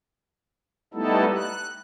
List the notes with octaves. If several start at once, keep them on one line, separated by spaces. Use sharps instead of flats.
G3 A3 B3 D#4 E4 A4
F#6